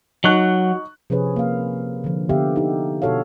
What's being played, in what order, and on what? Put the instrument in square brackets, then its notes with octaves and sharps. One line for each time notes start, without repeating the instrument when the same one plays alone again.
[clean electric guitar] F#3 [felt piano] D#4 C#6 F#6
[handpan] C3 F3 C#4 G#4 B4 C#5
A#3 F5
D3 F3
D3 B3 G4 E5 F5
D#4 G4
B2 F#4 A4 C#5 F5